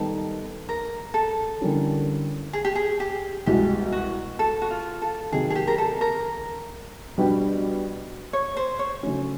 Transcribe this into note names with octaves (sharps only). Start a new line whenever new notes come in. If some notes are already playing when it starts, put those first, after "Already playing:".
Already playing: D#3 G3 B3 D#4 A4
A#4
A4
D3 G3 A#3 C#4 E4
G#4
G4
G#4
G4
C2 B2 G#3 G4
F#4
A4
F#4
F4
A4
C3 D#3 F#3 A#3 G#4
G#4
G4
A#4
A4
A#4
B2 G3 B3 D4 G4
C#5
C5
C#5
C#3 F#3 A3 C#4